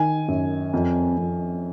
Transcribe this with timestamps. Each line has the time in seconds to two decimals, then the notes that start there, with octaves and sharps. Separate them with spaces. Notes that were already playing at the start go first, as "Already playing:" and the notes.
Already playing: D#3 G#5
0.28 F#2
0.73 F2
1.18 F2